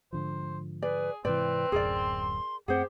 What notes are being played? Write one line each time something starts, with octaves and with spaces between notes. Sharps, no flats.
G#2 D3 F3 C5
G#4 B4 D5
G#2 C3 E3 C4 B4 D5 G5
D1 F#2 G#4 A#4 D5
C6
F#2 A3 C4 G4 G#4 C5 F#5